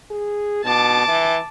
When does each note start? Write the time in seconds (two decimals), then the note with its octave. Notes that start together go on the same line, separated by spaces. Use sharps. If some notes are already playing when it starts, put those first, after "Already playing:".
0.11 G#4
0.64 B2 A5 D6
1.08 E3